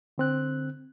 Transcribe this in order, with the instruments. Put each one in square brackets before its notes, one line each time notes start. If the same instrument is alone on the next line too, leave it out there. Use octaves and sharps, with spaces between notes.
[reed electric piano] D3 C4 F#6